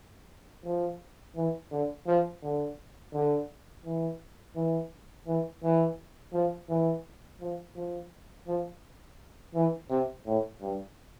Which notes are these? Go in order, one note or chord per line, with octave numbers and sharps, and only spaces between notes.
F3
E3
D3
F3
D3
D3
E3
E3
E3
E3
F3
E3
F3
F3
F3
E3
C3
A2
G2